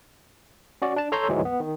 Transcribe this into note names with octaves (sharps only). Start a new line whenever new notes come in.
C#4 F#4 D5
D4 A5
A4 C#5 A#5 C6 E6 G6
D2 G#2 E3 F#3 G#3
B3
D#3